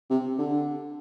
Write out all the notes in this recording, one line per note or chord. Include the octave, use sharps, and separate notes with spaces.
C3
D3